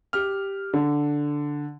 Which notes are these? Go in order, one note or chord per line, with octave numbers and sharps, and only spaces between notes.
G4 F6
D3